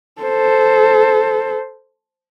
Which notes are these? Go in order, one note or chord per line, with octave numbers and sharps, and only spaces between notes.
A4 C5